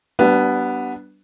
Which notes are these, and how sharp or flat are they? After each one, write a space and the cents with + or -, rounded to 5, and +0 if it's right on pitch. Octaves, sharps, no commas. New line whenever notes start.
G3 -30 B3 +0 D4 +0